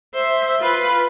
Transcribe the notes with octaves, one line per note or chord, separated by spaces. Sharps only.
C5 E5
F4 B4